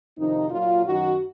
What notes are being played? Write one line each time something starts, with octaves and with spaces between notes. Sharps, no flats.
F2 C3 D#3 D#4
A#2 F#3 A#3 F4
F#2 D#3 F#3 F#4